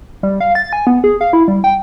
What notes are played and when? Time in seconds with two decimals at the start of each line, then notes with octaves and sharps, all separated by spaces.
0.23 G3
0.41 F5
0.55 A6
0.73 G#5
0.87 B3
1.04 G#4
1.21 F5
1.33 E4
1.48 G3
1.64 G5